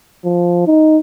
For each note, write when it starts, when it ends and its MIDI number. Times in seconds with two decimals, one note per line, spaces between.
0.25 0.63 53
0.67 0.98 63